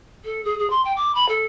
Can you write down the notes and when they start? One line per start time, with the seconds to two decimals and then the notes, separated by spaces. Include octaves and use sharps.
0.25 A4
0.44 G#4
0.59 G#4
0.70 C6
0.85 G5
0.97 D6
1.15 B5
1.29 A4